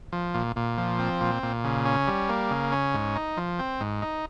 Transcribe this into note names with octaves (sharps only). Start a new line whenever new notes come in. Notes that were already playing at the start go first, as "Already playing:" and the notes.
F3
A#2
A#2
F3
C4
A#2
A#2
C#3
C#4
G3
A#3
C#3
C#4
G#2
D#4
F3
C4
G#2
D#4